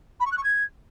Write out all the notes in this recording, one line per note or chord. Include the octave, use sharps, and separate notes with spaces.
B5
C#6
F#6
C#6
G#6